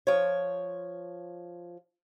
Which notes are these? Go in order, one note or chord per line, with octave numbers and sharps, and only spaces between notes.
F3 C#5